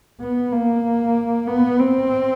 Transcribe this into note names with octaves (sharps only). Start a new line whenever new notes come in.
B3
A#3
B3
C4